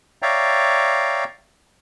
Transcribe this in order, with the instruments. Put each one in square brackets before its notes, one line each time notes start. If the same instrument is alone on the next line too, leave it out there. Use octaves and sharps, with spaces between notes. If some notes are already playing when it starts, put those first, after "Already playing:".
[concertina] C#5 D5 E5 F5 G5 A#5